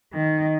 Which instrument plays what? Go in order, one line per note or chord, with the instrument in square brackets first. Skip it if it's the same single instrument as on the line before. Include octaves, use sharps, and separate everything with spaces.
[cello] D#3